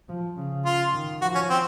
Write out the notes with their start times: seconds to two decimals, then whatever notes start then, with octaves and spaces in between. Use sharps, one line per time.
0.09 F3
0.37 C#3
0.65 F4
0.93 D#3
1.21 F3 F#4
1.35 C#4
1.49 C4